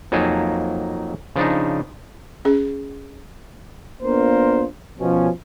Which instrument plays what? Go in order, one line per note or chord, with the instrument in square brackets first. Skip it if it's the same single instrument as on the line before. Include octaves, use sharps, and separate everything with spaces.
[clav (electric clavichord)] F2 F#3 A#3 D#4 G#5 A5
C#3 F3 D4 D#4
[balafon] C#4 G#4
[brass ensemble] A#3 B3 D4 F4 A#4 C5
B2 F3 C#4